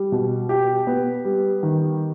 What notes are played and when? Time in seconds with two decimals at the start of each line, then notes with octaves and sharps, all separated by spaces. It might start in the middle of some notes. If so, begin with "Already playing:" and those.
Already playing: G3
0.12 B2
0.49 G4
0.87 B3
1.25 G3
1.63 D#3